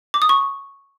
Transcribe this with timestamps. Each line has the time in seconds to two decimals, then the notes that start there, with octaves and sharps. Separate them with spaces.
0.14 D6
0.22 D#6
0.29 C#6